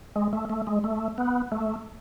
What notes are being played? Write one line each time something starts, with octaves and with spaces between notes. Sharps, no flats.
G#3
A3
A3
G#3
A3
B3
A3